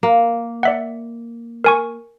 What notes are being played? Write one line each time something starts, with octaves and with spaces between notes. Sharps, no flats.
A#3
D5 E5 F#5
A#4 G#5 C#6